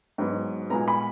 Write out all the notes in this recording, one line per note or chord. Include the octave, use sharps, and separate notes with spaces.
G#2 F#3 B3
A#2 G#3 B3 A#5
B5